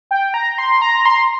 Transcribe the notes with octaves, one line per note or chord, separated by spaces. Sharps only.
G5
A#5
C6
A#5
C6